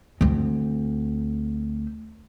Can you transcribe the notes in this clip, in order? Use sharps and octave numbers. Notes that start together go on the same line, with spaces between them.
D2 C4